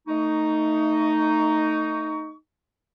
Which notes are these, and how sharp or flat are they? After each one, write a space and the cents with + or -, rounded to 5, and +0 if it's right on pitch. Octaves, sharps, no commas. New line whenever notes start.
A3 +25 D#4 +0 C#6 +25